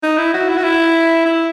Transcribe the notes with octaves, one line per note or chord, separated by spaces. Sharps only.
D#4
E4
F#4
E4
F#4
E4
E4